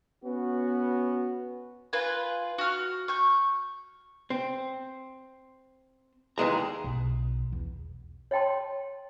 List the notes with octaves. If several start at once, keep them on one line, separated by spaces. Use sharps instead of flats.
B3 C#4 F#4
F4 B4 G#5
F#4 F6
C#6 G6
C4
D#2 E3 G#3 A#5
B1
E2
C#5 D#5 G5 A5 C6